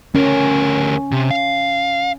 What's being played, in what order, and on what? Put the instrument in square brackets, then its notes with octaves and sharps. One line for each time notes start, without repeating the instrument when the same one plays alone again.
[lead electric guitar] D2 A#4 [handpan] C#4
[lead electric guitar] C3
F5